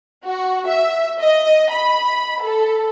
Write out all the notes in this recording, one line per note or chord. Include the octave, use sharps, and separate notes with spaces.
F#4
E5
D#5
B5
A4